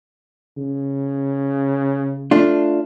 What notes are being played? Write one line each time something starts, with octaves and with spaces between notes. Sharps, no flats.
C#3
A3 D4 F4